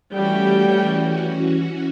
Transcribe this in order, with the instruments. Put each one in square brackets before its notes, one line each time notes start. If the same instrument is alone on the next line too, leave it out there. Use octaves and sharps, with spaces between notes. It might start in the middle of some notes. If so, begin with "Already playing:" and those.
[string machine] E3 C#4 F#4 [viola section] G3 A3 G5